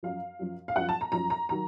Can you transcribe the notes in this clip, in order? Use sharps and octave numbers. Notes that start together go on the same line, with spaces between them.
F#2 F3 F5
F#2 F3
F5
F#2 F3 F#5
A5
A#5
F#2 F3 A#5
A#5
D#3 F#3 A#5